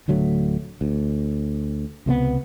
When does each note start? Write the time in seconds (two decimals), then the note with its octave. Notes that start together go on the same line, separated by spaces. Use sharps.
0.08 D1 D3 F#3 A3
0.81 D2
2.06 C#2 C3 G#3 B3